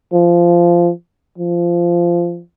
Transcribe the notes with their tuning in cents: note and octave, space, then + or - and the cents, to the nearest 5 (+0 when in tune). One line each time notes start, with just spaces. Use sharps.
F3 -15
F3 -15